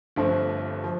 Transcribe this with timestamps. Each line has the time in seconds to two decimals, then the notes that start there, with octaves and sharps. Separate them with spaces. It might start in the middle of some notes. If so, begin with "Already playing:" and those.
0.16 G1 G2 F3 A3 C4
0.84 F3